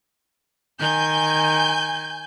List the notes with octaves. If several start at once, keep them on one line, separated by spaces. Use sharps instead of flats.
D#3 G#5 G6